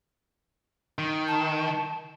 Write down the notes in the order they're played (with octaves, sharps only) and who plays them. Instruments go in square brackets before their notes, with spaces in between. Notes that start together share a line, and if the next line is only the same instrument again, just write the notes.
[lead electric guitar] D#3
[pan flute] A5